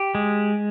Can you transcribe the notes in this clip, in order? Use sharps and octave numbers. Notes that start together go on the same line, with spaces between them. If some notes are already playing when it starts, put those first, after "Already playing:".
Already playing: G4
G#3